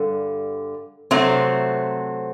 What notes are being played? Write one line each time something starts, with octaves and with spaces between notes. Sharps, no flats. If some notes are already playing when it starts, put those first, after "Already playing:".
Already playing: G2 D3 G3
C3 F#3 A3 C4